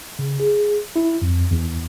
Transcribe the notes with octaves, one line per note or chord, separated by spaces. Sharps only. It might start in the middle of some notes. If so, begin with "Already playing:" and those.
C#3
G#4
E4
F2
E2